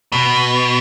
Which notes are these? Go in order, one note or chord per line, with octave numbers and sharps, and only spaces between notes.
B2